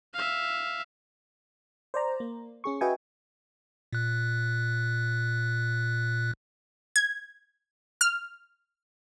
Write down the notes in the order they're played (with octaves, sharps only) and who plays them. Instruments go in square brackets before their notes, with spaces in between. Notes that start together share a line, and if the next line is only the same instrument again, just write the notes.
[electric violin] E5 F5
[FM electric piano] C5 D5 A#5
A#3
C#4 G#4 C#6
F#4 B4 D#5 E5 G5 G#5
[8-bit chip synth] A#2 F#6
[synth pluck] G#6
F6